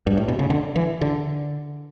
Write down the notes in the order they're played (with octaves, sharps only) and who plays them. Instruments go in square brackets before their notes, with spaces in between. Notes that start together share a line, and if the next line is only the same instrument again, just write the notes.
[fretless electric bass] G2
A2
B2
C#3
D3
E3
D3